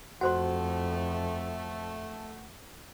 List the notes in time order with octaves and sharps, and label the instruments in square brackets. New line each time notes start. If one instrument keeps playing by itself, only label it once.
[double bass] F2 [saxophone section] A3 [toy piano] F#4 C5 C6 [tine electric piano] F#5